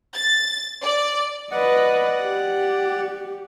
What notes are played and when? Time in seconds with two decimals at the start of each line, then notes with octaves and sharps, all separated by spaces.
0.14 A6
0.83 D5
1.51 B4 D5 D#5 F#5
2.23 G4